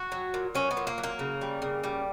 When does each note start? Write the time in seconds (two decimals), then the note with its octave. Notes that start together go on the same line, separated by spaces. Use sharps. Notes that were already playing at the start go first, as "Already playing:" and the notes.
Already playing: F#4
0.12 F#3
0.34 A#2
0.55 F#3 C#4
0.71 B3
0.77 A#2
0.87 A#3
0.98 F#3
1.04 A#3
1.19 C#3
1.42 G3
1.62 C#3
1.84 G3